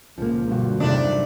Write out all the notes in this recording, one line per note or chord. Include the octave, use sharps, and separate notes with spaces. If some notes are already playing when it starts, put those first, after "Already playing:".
C#2 A#2 F3 A#3
G2 B2 D3 G3 F#4
E2 G2 C3 D#3 F#3 A3 D4